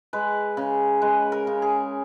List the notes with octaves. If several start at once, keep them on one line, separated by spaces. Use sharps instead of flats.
G#3 B4
C#3
G#3 B4
A#4
C#3
G#4